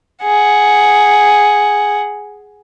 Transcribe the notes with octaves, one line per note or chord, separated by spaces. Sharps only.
G#4 F#5